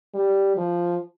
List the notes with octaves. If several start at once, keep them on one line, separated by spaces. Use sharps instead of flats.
G3
F3